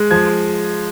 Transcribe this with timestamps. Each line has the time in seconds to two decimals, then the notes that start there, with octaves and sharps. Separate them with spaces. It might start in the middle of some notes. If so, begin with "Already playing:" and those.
Already playing: G#3
0.11 F3 G#6